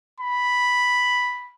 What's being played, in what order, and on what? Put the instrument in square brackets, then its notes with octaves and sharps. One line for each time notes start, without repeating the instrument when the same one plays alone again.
[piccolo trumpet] B5